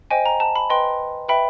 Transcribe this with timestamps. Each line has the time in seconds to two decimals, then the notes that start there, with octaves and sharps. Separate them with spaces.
0.11 C5 D#5 G5 G#5
0.26 A#5
0.40 A5
0.55 B5
0.70 B4 D#5 G5 C6
1.29 B4 E5 G5 B5